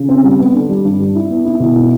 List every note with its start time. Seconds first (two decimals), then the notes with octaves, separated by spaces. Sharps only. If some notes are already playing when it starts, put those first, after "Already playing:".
Already playing: C#3
0.09 C4
0.24 G3
0.39 B3
0.54 D3
0.69 G3
0.85 G2
1.00 G3
1.15 E4
1.30 B3
1.45 E4
1.60 B2
1.75 E4